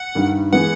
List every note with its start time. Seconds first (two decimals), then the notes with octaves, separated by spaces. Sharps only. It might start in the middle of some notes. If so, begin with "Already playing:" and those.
Already playing: F#5
0.15 G2 D#3 G3
0.53 E3 G#3 B3 F#5